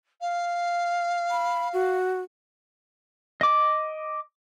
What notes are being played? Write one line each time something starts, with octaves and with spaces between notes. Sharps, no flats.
F5
B5
F#4
D#5 D6